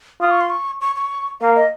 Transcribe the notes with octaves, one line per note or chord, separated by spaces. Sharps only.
F4 D#6
C#6
C6
C#6
C#6
C#6
A#3 F5
D#5